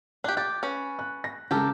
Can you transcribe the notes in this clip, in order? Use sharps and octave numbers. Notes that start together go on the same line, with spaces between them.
D4 G4 F#6
G4 A6
C#4 B4
F#6
A#6
C#3 G#3 G4 A4 A#4